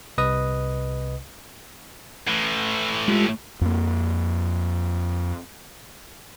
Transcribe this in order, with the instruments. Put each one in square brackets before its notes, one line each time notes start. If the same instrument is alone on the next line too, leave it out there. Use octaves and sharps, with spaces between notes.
[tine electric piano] C2 C3 B4 D#5 D#6
[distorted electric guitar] A2 E3
[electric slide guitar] G#3 F4 G4
[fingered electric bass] F2 A#3